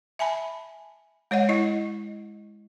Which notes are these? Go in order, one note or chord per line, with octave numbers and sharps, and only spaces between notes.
E5 G#5 A5 B5
G#3 C#5 D#5 F#5
E4 D#5